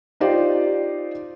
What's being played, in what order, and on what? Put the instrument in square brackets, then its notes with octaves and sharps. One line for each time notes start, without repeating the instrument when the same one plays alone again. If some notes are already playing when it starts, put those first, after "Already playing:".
[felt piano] D#4 F4 G4 C5 D5